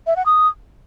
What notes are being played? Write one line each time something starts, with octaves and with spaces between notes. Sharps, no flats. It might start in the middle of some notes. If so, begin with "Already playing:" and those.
E5
F#5
D#6